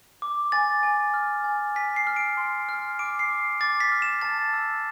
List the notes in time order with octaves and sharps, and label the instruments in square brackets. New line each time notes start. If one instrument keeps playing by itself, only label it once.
[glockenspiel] D6
G#5 A6
G#5
F6
G#5
G#5 B6
C7
F6
D7
C6
F6
D6 D7
C7
D6
D6 A6
B6
F6
E7
A5 A6
E6